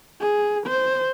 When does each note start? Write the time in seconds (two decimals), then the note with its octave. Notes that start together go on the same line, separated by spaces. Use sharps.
0.20 G#4
0.67 C5